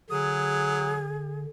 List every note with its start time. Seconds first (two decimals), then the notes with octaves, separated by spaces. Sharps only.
0.10 D3 F#3 G#4 D#6